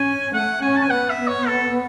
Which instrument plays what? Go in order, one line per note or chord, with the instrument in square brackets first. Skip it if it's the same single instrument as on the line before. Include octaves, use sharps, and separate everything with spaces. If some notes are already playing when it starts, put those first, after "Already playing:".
Already playing: [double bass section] C#4 [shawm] G#5
[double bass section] A3 [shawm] F#5
[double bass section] C#4 [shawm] G#5
[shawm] A5
G#5
[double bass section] B3 [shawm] F#5
[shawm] E5
C#5
A4